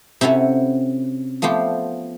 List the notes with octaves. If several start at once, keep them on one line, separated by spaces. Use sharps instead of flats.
C3 C#4 E4 F#4 A4
F3 A3 B3 F4 G4